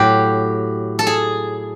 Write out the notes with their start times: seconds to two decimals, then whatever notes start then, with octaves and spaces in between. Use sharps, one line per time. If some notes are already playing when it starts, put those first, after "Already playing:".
Already playing: A2 F#3 G4
0.99 A4
1.07 G#4